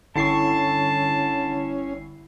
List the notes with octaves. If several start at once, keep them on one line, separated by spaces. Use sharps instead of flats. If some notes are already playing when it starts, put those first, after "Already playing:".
G1 D3 C#4 E4 A5 C#6 C7